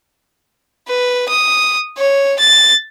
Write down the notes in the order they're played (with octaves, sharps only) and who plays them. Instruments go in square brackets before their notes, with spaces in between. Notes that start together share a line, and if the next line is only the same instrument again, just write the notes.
[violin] B4
D#6
C#5
A6